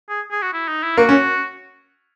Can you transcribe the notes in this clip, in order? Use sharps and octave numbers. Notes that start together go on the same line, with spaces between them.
G#4
G#4
F#4
E4
D#4
E4
A#3 F#4
C#4